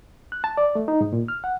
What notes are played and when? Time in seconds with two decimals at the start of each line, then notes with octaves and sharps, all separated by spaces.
0.32 F#6
0.44 A5
0.57 D5
0.75 A3
0.88 D#4
1.01 G#2
1.13 A#2
1.28 F6
1.44 F#5